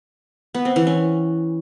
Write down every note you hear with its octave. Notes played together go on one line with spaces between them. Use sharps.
B3
C4
E3
C#4